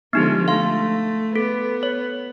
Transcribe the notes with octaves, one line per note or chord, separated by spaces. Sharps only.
D3 F3 G#3 B3 D#4 G4
A3 F5 C6
B3 A4
C#5